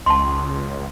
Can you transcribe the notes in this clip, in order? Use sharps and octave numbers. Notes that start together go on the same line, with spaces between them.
C#2 A5 C6